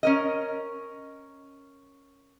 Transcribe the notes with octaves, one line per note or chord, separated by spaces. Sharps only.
C#4 A#4 D#5